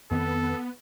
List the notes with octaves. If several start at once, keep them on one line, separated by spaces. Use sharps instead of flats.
F2 D#3 B3 C4 A4